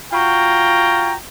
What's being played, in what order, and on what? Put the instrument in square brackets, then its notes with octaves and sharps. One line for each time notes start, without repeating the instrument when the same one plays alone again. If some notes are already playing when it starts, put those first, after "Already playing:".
[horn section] F4 F#4 G5 A#5